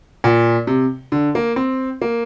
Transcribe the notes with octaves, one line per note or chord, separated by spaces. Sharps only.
A#2
C3
D3
A#3
C4
A#3